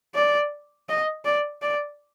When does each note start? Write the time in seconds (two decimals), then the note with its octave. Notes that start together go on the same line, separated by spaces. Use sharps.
0.15 D5
0.89 D#5
1.25 D5
1.62 D5